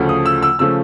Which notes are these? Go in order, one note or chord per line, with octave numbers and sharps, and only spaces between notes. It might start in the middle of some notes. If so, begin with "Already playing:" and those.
Already playing: D2 C#3 F3 A3
D#6
E6
E6
C#3 F3 A3 E6